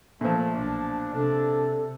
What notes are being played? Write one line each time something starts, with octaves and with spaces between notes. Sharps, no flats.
A#2 F3 A3
B1 D4
C3 D4 A4